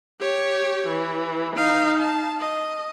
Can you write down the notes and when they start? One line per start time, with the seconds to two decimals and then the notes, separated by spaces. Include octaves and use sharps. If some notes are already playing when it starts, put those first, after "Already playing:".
0.20 G4 C#5
0.88 E3
1.56 D#4 F5
2.00 A5
2.40 D#5